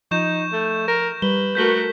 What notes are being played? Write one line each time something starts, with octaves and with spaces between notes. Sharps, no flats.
F3 D#4 C#6 G6 E7
A3
A#4
G3 B4 G7
A3 F#4 A#4 G6 B6 G7